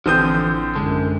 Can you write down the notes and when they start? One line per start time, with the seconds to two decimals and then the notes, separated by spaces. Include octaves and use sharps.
0.06 A1 D3 E3 F3 C4 D#6 G6
0.76 F#2 D3 G#3